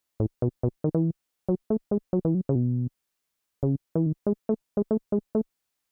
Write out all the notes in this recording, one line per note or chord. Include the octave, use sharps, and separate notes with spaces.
A2
B2
B2
D#3
E3
F#3
A3
G#3
F#3
E3
F#3
C#3
B2
C#3
E3
D#3
G#3
A3
G#3
A3
G#3
A3